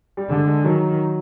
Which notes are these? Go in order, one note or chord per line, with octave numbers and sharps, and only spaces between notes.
G3
D3 G#3
G#3
D#3 F#3